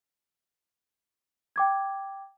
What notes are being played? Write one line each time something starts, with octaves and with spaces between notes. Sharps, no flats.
G5 D6 G#6